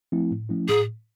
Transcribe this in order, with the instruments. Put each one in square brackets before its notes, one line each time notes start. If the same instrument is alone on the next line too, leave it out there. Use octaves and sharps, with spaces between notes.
[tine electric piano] F3 A3 C4 E4
A2
F3 A3 C#4 E4
[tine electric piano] A2 [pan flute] G#4